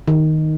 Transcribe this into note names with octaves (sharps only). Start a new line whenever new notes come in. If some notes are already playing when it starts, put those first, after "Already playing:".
D#3